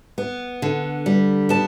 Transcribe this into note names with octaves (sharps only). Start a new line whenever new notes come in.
B3
D3
G3
B3 A5